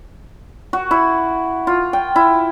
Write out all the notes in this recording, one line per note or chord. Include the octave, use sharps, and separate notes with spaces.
F#4
E4
F4
G5
E4